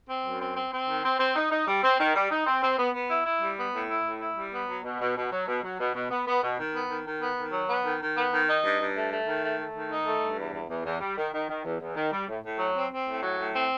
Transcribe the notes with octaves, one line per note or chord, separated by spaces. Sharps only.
C4
F#2
C4
C4
C4
D#3
C4
C4
D#4
D#4
G3
C4
D#3
G3
D#4
C4
C4
B3
B3
E4
E4
G3
B3
A2
E4
A2
E4
G3
B3
F#3
B2
B2
B2
F#3
B2
F#3
B2
B2
B3
B3
B2
D#3
B3
D#3
D#3
B3
D#3
F#3
B3
D#3
D#3
B3
D#3
D#4
G2
G2
A3
A3
D#3
A3
A3
D#3
D#4
A3
G2
E2
E2
E2
E2
G3
D#3
D#3
D#3
E2
E2
D#3
G3
A2
A2
F#3
C4
C4
A2
F#3
A2
C4